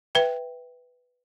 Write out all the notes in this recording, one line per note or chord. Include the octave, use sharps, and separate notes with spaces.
B4 E5 G5